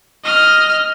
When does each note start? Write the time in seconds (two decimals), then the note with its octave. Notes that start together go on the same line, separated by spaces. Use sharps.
0.25 D#5 F6